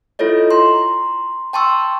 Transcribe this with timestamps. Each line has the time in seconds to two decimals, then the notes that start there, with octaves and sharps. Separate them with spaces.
0.19 E4 F4 A4 C#5 D#5
0.51 A#5 C6
1.53 G5 A5 C6 C#6 E6